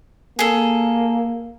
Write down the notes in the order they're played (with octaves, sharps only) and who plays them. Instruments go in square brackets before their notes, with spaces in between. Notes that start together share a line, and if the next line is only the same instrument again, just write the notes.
[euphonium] A#3 [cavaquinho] G#4 A4